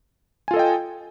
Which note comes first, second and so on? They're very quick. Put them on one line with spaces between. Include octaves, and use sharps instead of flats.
G#5 F4 A4 D#5 G5